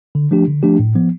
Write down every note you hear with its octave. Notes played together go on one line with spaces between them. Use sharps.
D3
F3 A3 D4 G4
D3
F3 A3 D4 G4
A2
F3 B3